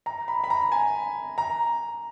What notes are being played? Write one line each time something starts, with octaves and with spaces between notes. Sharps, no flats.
A#5
B5
B5
A#5
G#5
A#5